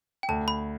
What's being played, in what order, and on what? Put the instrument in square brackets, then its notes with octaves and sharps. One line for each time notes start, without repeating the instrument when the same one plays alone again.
[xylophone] G5
[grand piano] D2 [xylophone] A5
[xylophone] B5